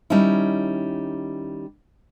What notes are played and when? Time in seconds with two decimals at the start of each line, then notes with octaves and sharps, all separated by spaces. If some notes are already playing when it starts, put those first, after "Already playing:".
0.10 D#3 G3 C#4 D#4 E4